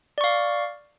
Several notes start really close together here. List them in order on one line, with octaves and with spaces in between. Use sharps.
D5 C#6 F5